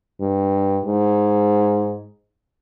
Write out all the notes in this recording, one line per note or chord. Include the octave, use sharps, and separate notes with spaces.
G2
G#2